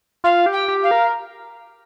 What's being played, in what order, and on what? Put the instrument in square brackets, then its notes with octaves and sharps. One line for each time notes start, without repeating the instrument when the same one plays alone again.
[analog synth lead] F4 [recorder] F5
[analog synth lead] G4
[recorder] G5
[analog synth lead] G4
[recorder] F5
[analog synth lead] A#4